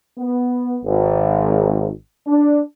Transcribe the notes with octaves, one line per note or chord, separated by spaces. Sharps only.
B3
G#1
D4